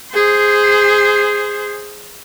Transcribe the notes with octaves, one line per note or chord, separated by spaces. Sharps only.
G#4 C5